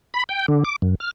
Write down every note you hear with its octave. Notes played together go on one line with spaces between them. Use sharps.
B5
G5
D3
D6
F#2
F6